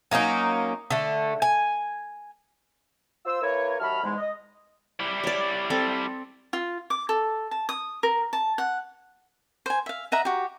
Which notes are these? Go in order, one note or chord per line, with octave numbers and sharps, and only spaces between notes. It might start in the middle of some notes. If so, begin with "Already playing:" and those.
F#3 A#3 C#4 D#4
D3 A3
G#5
F4 C5 E6
A#3 E4 A#4 B4 C#5
D#2 F#3 E5 A5 B5 F6
E2 G#2 G#3
D#5
G3 E4
C#5 D5
C4 A4 D5
F4
D6
A4
A5
D#6
A#4
A5
F#5
C5 G#5
E5 F5
D#5 E5 F#5 A#5
F#4 G4